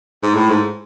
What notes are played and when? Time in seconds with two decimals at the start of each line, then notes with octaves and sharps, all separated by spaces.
0.23 G#2
0.35 A2
0.50 G#2